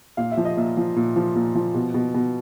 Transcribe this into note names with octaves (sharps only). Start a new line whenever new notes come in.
A#2 F5
E5
F3
D#5
A#2 E5
F3
A#2
F3
A#2
F3
B2
B2
B2